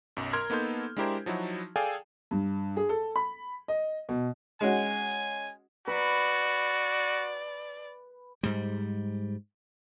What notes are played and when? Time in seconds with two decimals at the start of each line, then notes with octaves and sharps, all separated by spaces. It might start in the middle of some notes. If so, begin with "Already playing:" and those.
0.17 B1 F#2
0.33 A#4 A#5 C6 F6 G#6
0.50 A#3 B3 D#4 A4 C6 G6
0.97 G#3 D4 E4 G4 A#4 C5
1.26 F3 F#3 D#4 E4 F#4
1.76 G#4 A4 D5 F5 G5 G#5
2.31 G2
2.77 G#4
2.89 A4
3.16 B5
3.68 D#5
4.09 B2
4.61 G#3 C#4 F#4 G#5
5.88 F#4 B4 D5
8.43 G#2 G3